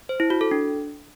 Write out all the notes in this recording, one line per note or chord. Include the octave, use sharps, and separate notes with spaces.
C5
E4
F#4
A4
D4